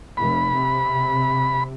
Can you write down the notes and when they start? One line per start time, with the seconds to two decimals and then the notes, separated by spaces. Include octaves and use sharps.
0.17 F1 B5
0.53 C3